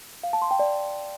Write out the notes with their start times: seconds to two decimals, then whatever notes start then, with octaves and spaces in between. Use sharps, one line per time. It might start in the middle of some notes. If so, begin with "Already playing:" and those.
0.23 F5
0.33 A5
0.42 C6
0.51 G5
0.59 D5